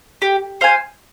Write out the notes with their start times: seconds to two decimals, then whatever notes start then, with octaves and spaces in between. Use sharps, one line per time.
0.22 G4
0.61 C5 F5 G#5